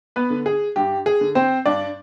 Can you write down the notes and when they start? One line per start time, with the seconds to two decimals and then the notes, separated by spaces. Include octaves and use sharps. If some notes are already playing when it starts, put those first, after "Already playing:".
0.16 B3 B4
0.30 D3
0.46 G#4
0.76 G2 G4
1.06 G#4
1.21 D3
1.35 C4 C5
1.66 G2 D4 D5